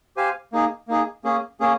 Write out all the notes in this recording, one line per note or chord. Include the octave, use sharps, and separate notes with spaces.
G4 C5 F5 G#5
A#3 D#4 G#4
A#3 D#4 G#4
A#3 C#4 G#4
A#3 C#4 G#4